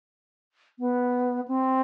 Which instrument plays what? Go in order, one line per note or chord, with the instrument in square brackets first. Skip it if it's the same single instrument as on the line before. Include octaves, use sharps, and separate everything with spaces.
[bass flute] B3
C4